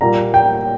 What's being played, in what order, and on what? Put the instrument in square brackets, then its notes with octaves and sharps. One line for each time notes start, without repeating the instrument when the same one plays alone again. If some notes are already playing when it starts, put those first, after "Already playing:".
[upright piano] A#2 G3 A#3 A#5
G5